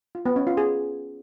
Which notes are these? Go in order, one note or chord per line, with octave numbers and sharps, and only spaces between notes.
F4
B3
C#4
F4
G#4